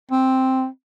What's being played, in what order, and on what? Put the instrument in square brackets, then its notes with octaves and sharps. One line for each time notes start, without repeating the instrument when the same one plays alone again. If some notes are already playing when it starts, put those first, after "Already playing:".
[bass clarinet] C4